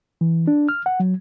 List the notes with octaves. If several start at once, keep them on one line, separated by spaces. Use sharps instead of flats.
E3
D4
F6
F#5
F#3